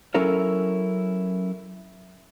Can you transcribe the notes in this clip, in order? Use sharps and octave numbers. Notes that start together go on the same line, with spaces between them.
F#3 C#4 E4 A4 A#4 C#5